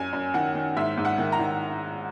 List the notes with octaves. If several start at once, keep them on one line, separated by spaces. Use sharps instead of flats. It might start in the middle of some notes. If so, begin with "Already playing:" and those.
Already playing: F#2 G#5
F#2
D#3 F#5
D#3
G#2 E5
G#2
F#5
D#3
A#5
D#3